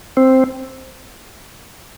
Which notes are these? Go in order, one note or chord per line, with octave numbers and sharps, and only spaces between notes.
C4